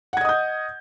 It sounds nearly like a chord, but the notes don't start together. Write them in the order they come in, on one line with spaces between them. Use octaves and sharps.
F#5 G#6 D#5 D#6 G6